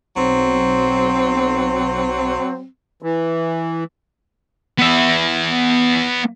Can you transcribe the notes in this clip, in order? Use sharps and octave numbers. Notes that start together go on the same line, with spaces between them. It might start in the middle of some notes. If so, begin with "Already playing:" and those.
B1 F#3 C4
E3
B3 E5